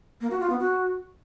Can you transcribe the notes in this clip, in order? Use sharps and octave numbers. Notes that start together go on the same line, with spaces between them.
A#3
F#4
F4
B3
F#4